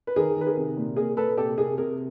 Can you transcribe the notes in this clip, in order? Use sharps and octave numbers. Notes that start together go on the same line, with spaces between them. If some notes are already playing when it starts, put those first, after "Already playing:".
B4
D#3 G#4 A#4
D#3 B4
G#4 A#4
C3
A#2
A#2 G#4 A#4
A#2 A4 B4
C3 G4 A4
C3 G#4 A#4
C3 G#4 A#4